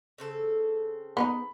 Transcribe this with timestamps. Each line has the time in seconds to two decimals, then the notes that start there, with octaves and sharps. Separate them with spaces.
0.18 C#3 C4 A4
1.17 B3 C#4 D#4 B5